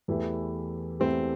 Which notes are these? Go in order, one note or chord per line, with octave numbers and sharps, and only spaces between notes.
E2 E3 A3 E4 G4
E2 E3 A3 C4 E4 G4